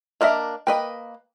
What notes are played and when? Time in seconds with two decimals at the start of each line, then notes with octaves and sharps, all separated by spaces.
0.21 A#3 D4 A#4 D#5 E5
0.67 A#3 B4 D#5 G5